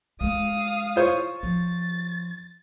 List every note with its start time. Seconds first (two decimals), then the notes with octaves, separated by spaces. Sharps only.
0.21 G#3 A3 F5 D#6
0.96 F4 C5 C#5
1.43 F3 A6